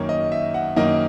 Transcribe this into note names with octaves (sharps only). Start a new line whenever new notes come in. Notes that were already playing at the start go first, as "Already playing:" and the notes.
Already playing: F#2 D#3 A#3 C#5
D#5
E5
F#5
F#2 D#3 A#3 D#5